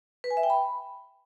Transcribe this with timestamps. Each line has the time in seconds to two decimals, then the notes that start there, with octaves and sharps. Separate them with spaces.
0.24 B4
0.30 G#5
0.37 E5
0.43 G5
0.50 B5